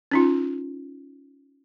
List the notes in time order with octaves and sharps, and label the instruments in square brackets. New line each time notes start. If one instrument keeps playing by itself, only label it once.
[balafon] C#4 D#4 F4